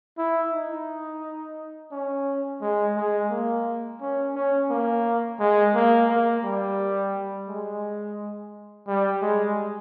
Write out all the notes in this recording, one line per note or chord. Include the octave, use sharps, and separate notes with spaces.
E4
D#4
C#4
G#3
G#3
A#3
C#4
C#4
A#3
G#3
A#3
A#3
G3
G#3
G3
G#3